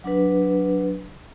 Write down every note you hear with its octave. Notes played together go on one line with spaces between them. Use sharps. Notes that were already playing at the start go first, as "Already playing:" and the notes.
F#3 D4 B4